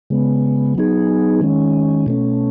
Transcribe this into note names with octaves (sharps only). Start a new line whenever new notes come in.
C#3 G#3 B3
F#3 B3 D#4 G#4
D#3 G#3 C#4
B2 A3 C#4